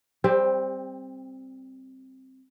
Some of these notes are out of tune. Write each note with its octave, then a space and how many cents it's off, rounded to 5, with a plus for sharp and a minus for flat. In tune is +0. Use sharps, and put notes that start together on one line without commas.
G3 +0 C4 +5 G4 +35